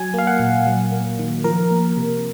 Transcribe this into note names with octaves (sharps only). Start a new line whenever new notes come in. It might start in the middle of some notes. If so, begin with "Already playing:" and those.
Already playing: F#3 G#5
A#3 F5
F#5
A#2
F#3
A#3
D#3
F3 A#4
A#3
C3